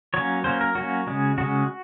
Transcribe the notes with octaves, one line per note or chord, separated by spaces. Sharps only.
F#3 A#3 C#4 C#5
F#3 A#3 C#4 C5
A#4
F#3 A#3 C#4 F#4
C#3 G#3 C#4
C#3 G#3 C#4 F#4